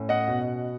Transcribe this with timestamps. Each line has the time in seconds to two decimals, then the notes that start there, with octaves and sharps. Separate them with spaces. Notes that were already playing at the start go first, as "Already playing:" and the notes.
Already playing: A2 C#4
0.09 D#5 F#5
0.28 B2